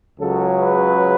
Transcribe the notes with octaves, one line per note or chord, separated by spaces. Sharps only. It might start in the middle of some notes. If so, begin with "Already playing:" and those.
C#2 C#3 F#3 A4
B4